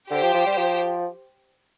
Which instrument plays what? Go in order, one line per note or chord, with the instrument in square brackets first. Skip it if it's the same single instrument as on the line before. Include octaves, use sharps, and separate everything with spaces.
[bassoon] D3 [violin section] G4 C5 G5
[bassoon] F3
F3
G3
F3